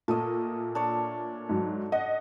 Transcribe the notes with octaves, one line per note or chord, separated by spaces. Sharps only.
A#2 A3 D#5
D4 C#5
G#2 F#3
D#5 F#5